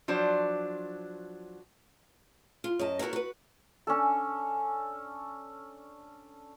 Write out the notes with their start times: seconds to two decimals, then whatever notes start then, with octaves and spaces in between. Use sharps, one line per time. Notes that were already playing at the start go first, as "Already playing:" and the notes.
0.08 F3 F#3 D4 C5
2.64 F4
2.79 F#2 D#5 A5
2.99 A#3 B3 E4 F#4 A#4
3.13 F#4 B4
3.87 C#4 D4 A4